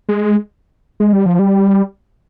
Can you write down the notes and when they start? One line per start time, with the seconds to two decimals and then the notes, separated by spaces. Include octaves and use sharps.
0.09 G#3
1.00 G#3
1.13 G3
1.26 F3
1.39 G3